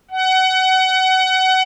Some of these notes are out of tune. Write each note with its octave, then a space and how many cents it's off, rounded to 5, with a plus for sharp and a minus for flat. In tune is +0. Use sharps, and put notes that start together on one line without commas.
F#5 +25